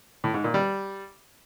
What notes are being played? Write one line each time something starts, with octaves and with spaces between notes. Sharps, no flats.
A2
G#2
A#2
G3